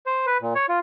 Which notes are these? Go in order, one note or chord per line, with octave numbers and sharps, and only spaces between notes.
C5
B4
A#2
C#5
F4